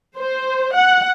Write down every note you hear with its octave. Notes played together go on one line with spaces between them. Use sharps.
C5
F#5